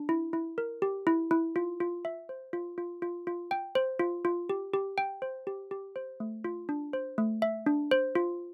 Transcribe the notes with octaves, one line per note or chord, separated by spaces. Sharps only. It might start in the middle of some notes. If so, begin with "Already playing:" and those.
Already playing: D4
E4
E4
A#4
G4
E4
E4
F4
F4
E5
C5
F4
F4
F4
F4
G5
C5
F4
F4
G4
G4
G5
C5
G4
G4
C5
A3
F4
D4
C5
A3
E5
D4
C5
F4